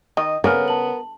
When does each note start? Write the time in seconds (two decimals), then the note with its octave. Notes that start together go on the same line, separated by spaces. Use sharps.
0.17 D#3 D#5
0.44 C#3 B3 A#4 C#5 G#5 F6
0.68 A5 F#7